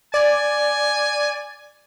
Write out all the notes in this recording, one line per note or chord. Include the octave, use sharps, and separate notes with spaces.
D5 G#5